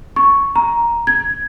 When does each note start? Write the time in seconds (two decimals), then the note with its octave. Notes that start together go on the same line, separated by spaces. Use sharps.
0.16 C#6
0.56 A#5
1.07 G#6